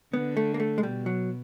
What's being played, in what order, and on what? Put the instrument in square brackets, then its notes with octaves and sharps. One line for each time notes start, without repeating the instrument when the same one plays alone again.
[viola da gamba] D3 [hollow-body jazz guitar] B3
[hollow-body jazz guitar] A3
A#3
A3
G#3
[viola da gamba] B2 [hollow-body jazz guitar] G3
[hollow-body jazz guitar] F#3